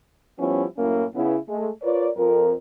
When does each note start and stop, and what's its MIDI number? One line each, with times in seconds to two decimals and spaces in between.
0.39 0.64 53
0.39 0.64 55
0.39 0.64 59
0.39 0.64 61
0.39 0.64 64
0.78 1.05 42
0.78 1.05 45
0.78 1.05 58
0.78 1.05 61
0.78 1.05 64
1.15 1.35 49
1.15 1.35 59
1.15 1.35 64
1.48 1.69 56
1.48 1.69 57
1.82 2.08 65
1.82 2.08 70
1.82 2.08 71
1.82 2.08 73
1.82 2.08 74
2.17 2.53 41
2.17 2.53 70